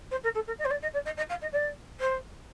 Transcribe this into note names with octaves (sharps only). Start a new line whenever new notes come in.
C5
A#4
A4
A#4
D#5
C5
D5
D#5
D5
D#5
D#5
F5
D#5
D5
C5